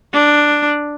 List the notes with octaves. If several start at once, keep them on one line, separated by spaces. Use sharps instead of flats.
D4